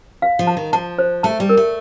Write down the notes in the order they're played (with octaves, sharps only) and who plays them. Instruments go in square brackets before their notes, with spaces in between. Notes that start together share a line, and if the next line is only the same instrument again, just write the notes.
[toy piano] F5
[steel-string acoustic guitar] F3
[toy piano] A5
[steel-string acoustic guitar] D#3
[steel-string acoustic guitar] F3 [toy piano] A5
[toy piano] C5
[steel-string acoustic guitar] A3 [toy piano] A5
[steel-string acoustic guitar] G3
[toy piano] A#4
[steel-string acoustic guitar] A3